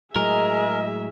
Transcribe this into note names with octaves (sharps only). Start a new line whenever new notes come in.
A2 F#3 G#3 G#4 A#4 D#5 E5 G#5